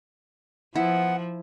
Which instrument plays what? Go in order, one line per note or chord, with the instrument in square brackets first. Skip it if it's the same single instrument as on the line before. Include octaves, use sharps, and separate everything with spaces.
[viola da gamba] F3 [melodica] B3 F#5 [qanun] E4